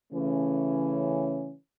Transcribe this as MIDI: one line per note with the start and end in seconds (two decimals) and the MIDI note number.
0.13 1.52 49
0.13 1.52 52
0.13 1.52 57
0.13 1.52 61